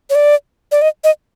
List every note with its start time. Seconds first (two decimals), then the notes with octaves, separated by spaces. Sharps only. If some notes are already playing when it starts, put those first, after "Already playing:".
0.10 C#5
0.15 D5
0.72 D5
0.82 D#5
1.04 D#5